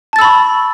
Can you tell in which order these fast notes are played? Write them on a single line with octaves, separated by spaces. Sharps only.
A5 A6 E6 B5 C#6